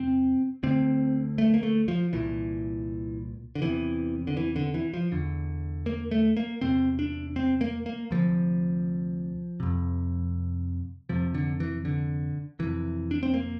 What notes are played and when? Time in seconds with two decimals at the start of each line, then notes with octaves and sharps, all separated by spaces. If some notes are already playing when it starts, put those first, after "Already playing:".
Already playing: E2 C3 C4
0.63 D2 D3 C4
1.38 A3
1.54 A#3
1.63 A3
1.88 F3
2.13 C2 A#2 E3
3.55 D3
3.62 E2 C3 E3
4.27 D3
4.37 E3
4.56 D3
4.74 E3
4.94 F3
5.12 E2 D3
5.86 A#3
6.11 A3
6.37 A#3
6.61 E2 C3 C4
6.99 D4
7.36 C4
7.61 A#3
7.86 A#3
8.11 D2 C3 F3
9.60 F2 C3
11.09 F2 C3 F3
11.35 D3
11.60 E3
11.85 D3
12.59 F2 C3 E3
13.11 D4
13.23 C4
13.34 A#3